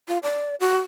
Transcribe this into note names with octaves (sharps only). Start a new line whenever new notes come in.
F4
D5
F#4